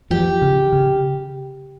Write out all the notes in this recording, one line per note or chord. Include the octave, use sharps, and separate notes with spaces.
F3 G4
C#3
C#3